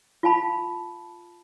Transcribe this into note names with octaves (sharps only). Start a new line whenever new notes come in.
F4 F5 A5 B5